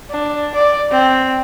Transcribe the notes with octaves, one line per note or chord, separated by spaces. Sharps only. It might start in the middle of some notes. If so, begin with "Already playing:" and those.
D4
D5
C4